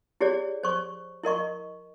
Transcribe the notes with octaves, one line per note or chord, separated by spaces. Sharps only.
E4 G4 G#4 C#5 D5
C5 C#6
E4 A#4 D#5 C#6